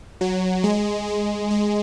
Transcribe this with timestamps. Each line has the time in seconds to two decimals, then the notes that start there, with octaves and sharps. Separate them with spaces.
0.21 F#3
0.64 G#3
1.08 G#3
1.51 G#3